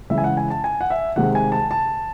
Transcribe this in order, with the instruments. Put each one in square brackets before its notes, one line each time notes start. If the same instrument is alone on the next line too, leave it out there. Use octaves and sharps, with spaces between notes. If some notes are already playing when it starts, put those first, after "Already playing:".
[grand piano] C#3 E3 G#3 E5
G#5
F#5
G#5
A5
G#5
F#5
E5
C3 D#3 G#3 F#5
G#5
A5
A5